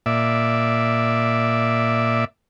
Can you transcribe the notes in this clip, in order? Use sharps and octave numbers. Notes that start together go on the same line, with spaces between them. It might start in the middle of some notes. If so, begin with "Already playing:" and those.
A#2 D5 E5